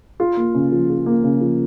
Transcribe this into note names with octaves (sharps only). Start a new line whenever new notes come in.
F4
A#3
C#3
F3
F4
A#3
C#3
F3